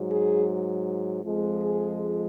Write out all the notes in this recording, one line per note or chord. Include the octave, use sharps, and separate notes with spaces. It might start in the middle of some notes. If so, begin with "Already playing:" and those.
Already playing: G#2 F#3
G#4
F2 F3 G#3
G#4